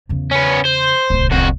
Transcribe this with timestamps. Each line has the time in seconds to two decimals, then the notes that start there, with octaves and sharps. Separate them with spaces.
0.09 E2 C#3
0.31 B3 C#4
0.65 C5
1.10 D1 C2
1.32 F2 F#4